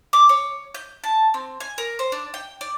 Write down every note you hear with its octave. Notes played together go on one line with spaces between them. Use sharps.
D6
C#5
G6
A5
C4
G#5
A#4
C5
D4
G5
D5